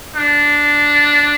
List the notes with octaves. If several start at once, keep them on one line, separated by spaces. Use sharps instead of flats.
D4